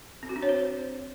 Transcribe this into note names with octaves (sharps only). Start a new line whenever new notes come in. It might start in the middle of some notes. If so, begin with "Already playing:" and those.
C4
F#4
D4
C#5
C5